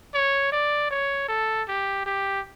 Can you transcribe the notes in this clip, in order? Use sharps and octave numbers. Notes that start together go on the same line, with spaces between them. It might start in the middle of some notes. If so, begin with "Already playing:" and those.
C#5
D5
C#5
A4
G4
G4